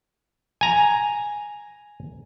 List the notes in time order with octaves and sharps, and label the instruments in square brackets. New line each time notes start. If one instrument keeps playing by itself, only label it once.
[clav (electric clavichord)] G#5 A#5